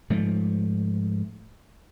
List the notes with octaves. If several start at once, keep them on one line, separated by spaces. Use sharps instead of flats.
G#2 F3 A3